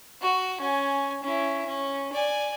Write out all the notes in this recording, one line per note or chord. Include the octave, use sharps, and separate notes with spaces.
F#4
C#4 G#5
C#4 E4
C#4
D5 G#5